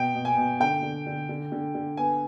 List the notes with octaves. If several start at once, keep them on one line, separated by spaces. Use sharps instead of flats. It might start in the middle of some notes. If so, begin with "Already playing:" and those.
Already playing: B2 G5
B2
G#5
B2
D3 G5
D3
D3
D3
D3
D3
B3 G#5